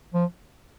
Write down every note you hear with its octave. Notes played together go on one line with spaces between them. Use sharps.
F3